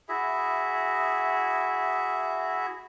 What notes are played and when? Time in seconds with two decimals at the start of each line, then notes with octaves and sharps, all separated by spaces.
0.09 E4 F#4 G#4 E5